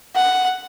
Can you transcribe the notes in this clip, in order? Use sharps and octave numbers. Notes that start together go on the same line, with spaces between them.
F#5